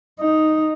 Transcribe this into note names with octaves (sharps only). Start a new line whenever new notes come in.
D#4